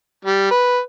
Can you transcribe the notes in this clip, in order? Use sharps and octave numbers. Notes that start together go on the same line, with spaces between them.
G3
B4